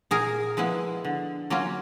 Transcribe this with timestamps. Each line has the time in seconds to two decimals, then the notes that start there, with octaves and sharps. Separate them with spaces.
0.11 A#2 G#4 A#4
0.57 F3 G#3 B3 E4
1.05 D3
1.50 F#3 A#3 C#4 F4